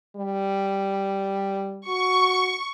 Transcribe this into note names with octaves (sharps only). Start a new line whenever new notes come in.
G3
F#4 C#6